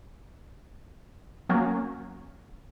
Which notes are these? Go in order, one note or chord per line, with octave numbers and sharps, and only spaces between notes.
F#3 A#3 C#4 F#4